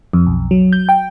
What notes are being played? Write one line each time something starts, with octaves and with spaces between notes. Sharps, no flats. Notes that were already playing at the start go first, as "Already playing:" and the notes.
F2
B1
F#3
G6
G5